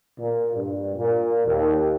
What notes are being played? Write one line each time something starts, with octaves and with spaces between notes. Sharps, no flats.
A#2
G2
A#2
D#2